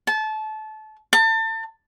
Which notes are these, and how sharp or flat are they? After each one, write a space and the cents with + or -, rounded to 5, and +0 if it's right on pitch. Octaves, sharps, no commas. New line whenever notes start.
A5 -25
A5 +35